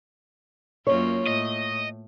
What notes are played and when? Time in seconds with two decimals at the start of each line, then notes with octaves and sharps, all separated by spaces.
0.87 F#2 A#3 F4 C#5
1.27 A2 D#5